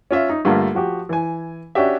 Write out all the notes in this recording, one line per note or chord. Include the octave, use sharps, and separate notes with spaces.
C#4 F4 E5
D#4
G2 D3 A3 A#3 F4
F3 F#4 G4
E3 G#5
C#4 D4 F#4 G4 E5